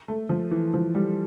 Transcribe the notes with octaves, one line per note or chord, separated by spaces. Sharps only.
A3
F3
E3
F3
G3